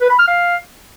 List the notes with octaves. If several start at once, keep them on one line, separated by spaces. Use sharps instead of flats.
B4
B5
F6
F5